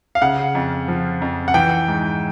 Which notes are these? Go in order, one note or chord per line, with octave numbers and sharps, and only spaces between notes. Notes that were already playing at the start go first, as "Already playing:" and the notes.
F5
C#3 F#5
F2
F3
F2
F#5
E3 G5
G#2